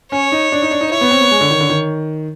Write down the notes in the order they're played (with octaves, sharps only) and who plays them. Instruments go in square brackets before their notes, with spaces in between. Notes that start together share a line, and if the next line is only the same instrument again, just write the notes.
[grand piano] C#4 [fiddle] C#5
[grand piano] D#4
D4
D#4
D4
D#4
[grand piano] E4 [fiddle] C#5
[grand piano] B3
C4
B3
G#3
D3
D#3
D3
D#3